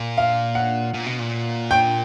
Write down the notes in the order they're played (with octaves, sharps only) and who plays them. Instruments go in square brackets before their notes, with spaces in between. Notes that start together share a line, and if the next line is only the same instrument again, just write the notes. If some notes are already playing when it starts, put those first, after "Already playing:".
Already playing: [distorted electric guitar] A#2
[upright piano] F5
F#5
[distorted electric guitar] A#2
B2
A#2
[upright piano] G5